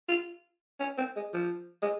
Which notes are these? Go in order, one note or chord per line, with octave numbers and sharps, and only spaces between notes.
F4
C#4
C4
G#3
F3
G#3